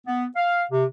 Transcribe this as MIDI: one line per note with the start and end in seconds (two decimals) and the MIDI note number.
0.07 0.25 59
0.36 0.63 77
0.71 0.85 48